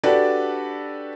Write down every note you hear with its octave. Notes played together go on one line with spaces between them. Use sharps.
D4 F#4 G4 A4 B4 D5